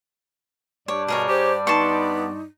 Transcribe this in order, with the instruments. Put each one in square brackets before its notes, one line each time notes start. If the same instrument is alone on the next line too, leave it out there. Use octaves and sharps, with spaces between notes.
[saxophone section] G2 D5 [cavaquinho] C#5
[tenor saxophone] B2 [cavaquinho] G#4 A#4 C#5 [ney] A5
[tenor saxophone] G4 [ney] C5
[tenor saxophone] B3 [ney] D#4 [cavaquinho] A5 C6 C#6